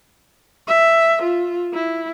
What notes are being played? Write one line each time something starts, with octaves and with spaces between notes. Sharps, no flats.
E5
F4
E4